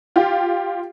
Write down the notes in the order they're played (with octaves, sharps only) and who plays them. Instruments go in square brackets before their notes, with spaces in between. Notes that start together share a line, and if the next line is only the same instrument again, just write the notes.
[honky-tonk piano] F4 G4